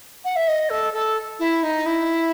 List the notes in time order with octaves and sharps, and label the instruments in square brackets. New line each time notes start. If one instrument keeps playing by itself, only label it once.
[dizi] F#5
E5
D#5
A4
A4
E4
D#4
E4